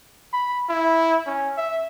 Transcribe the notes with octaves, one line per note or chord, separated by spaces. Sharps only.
B5
E4
C#4
E5